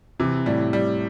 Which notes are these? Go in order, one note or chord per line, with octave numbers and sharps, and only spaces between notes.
C3 E3
A2 G3
G3